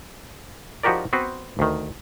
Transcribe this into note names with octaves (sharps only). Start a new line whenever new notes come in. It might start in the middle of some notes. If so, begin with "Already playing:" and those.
F3 D#4 F#4 G4 A#4 D5
B3 C4 F#4 B4 C5
D2 D#3